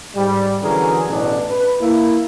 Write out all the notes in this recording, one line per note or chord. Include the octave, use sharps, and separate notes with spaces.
G#2 G3
D3 E3 F#3 C#4 G#4 A#4
A1 B2 D4
B4
A#3 E4